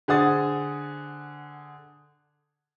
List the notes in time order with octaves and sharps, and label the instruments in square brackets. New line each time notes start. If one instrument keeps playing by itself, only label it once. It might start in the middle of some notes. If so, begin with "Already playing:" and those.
[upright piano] D3 G#4 C5 F#5 D#6 A6